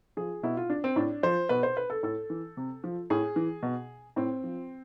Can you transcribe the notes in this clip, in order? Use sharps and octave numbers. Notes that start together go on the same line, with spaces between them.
F3 G#4
B2 E4
F4
D4
C4
A2 D4
F3 C5
B2 B4
C5
B4
A4
A2 A4
E3
C3
F3
A2 G#4
E3
B2
A2 C4
F3